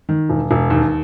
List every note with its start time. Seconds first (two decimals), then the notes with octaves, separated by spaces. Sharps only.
0.09 D#3
0.30 E1
0.51 E1
0.70 D#2